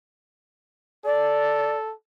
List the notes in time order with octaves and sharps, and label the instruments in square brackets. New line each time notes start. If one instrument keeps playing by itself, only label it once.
[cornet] A4 [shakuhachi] D5